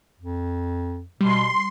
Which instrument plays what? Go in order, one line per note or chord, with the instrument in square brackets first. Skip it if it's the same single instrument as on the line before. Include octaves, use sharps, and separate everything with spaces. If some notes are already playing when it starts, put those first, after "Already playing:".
[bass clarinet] F2
[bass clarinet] B2 [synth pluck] G3 [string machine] C6